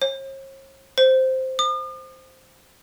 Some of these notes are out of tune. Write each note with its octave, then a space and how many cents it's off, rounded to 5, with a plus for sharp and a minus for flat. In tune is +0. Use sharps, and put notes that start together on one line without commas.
C#5 -45
C5 +0
D#6 -45